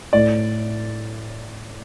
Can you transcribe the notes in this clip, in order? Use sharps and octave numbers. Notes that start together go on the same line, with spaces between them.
A2 D5